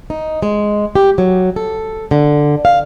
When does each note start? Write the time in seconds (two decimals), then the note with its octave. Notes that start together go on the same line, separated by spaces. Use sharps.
0.10 D#4
0.43 G#3
0.96 G4
1.18 F#3
1.56 A4
2.11 D3
2.65 F5